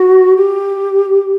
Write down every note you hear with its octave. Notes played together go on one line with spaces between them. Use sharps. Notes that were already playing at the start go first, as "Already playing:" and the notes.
Already playing: F#4
G4